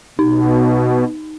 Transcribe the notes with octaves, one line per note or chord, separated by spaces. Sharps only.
B2 D#4